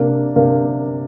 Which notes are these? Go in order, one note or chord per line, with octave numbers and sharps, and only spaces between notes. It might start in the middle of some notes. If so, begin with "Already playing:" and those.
Already playing: C3 A#3 D4 A#4 F5
C3 A#3 D4 A#4 F5